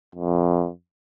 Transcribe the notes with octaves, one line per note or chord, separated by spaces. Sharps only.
F2